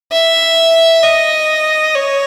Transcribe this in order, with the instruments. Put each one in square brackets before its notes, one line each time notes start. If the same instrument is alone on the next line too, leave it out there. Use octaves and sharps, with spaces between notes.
[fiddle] E5
D#5
C#5